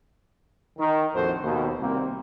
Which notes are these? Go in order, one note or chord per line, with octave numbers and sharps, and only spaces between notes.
D#3
A#1 F2 A2 F#4 A4 C5
D#2 B2
C2 A#3 C4